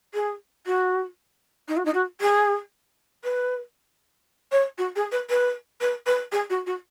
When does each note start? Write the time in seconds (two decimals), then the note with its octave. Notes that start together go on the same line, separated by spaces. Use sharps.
0.14 G#4
0.66 F#4
1.68 D#4
1.77 F#4
1.85 D#4
1.94 F#4
2.21 G#4
3.24 B4
4.52 C#5
4.78 F#4
4.96 G#4
5.12 B4
5.30 B4
5.81 B4
6.06 B4
6.32 G#4
6.50 F#4
6.66 F#4